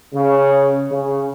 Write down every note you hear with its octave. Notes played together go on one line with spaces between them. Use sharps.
C#3
C#3